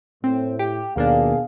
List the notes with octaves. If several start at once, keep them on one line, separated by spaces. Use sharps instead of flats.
A2 C4
G4
D#2 B2 A#3 D4 G#4 F5